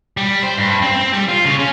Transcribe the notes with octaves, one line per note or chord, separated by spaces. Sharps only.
G3
C5
G2
C4
C4
G3
F4
C#3
C#4